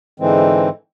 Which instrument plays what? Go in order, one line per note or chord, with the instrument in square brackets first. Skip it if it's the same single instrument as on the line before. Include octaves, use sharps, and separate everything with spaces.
[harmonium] G#2 D3 E3 G#3 C4